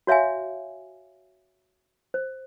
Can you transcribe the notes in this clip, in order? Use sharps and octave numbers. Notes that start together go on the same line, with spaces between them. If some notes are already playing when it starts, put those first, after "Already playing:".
F#4 C#5 E5 F5 G#5
C5